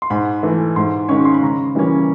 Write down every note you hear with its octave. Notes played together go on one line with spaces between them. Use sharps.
C6
G#2 B5
E3 A3
G#2 C6
D#3 G#3 C#4 C#6
C6
B5
C#3 A#5
E3 G3 A#3 C#4